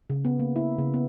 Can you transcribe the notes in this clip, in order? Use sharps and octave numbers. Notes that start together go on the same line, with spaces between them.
C#3
B3
A#3
E4
C#3
B3